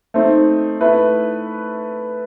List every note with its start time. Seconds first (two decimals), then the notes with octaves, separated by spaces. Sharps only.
0.14 A3 C4 D#4
0.81 A3 E4 B4